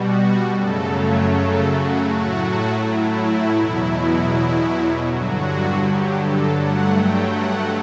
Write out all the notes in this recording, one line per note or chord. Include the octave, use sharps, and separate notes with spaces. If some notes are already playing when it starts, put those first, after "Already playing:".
Already playing: B2 G3 F#4
F#2 C#3 F#3 A3 A4
C#5
A4
F#4
A2 F#3 A3 F#4
E4
E2 B2 F#3
G2 D3 F#3 F#4
G4
A4
G2 F#3 A3 F#5
G5
F#5